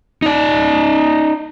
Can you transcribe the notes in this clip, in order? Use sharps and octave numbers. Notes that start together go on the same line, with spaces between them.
D#4 D5